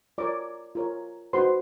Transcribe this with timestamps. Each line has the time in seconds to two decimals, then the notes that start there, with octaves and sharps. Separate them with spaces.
0.18 F4 A#4 C#5 D5 D6
0.75 F4 A#4 C#5
1.33 D#4 F#4 B4 C5 C6